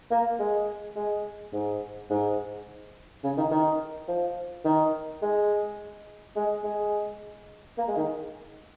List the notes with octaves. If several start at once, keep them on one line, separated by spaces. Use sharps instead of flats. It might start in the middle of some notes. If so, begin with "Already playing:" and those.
A#3
G#3
G#3
G#2
G#2
C#3
D#3
D#3
F3
D#3
G#3
G#3
G#3
A#3
G#3
D#3